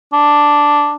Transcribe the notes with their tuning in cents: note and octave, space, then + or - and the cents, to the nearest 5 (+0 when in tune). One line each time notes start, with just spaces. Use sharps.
D4 +0